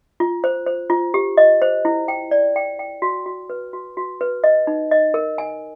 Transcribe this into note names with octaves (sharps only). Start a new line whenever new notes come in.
F4
C5
C5
F4
G4
D#5
C5
E4
G5
D5
G5
G5
F#4
F#4
B4
F#4
F#4
B4
D#5
D#4
D#5
A#4
G#5